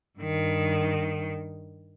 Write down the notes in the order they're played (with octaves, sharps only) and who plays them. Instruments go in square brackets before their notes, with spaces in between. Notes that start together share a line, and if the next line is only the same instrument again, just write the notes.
[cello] G2 D#3